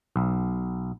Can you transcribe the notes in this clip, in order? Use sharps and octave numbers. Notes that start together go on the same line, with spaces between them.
B1